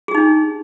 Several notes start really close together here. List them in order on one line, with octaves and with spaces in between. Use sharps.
G#4 G4 D#4 D4